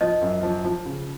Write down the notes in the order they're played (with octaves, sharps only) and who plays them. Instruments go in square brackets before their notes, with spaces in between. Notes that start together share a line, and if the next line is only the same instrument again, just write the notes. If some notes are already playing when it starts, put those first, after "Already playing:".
[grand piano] F3 [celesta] D#5
[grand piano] F#2
F3
F3
C#3